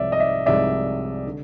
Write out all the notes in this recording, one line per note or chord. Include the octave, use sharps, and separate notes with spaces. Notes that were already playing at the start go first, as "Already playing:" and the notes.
Already playing: C2 C3 F3 G#3 D5 E5
D#5
D5 E5
C2 C3 F3 G#3 D5 E5
D3